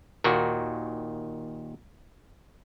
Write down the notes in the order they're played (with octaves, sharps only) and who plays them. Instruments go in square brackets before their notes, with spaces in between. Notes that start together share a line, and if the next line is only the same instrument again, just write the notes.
[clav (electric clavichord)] D#2 A#2 D#3 F#4